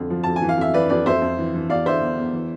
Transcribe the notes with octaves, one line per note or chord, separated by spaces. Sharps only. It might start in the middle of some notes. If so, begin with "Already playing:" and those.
Already playing: F2 D3
F3
F2 A5
G#5
E3
F5
F2 E5
E3 B4 D5
F2 B4 D5
F2 C5 E5
F2
E3
E3
E2 D5 F5
D3 C5 E5
E2
E2
E3